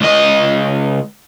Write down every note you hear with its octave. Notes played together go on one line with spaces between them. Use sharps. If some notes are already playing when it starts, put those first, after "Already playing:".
C#2 D#5